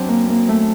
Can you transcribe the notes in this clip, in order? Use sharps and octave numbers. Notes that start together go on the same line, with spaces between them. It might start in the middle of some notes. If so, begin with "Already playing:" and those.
Already playing: F#2 F#3 C4 D4
A#3
A#3
A3